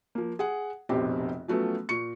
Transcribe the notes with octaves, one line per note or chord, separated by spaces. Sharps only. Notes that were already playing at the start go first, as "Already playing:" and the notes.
F3 A#3
G#4 F#5
F1 A#1 B2 C4 G4
F3 F#3 A3 B3 C#4
A#2 C#6 C#7